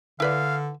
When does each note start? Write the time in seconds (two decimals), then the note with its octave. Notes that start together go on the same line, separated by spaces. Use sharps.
0.20 D3 E4 B4 D5 F5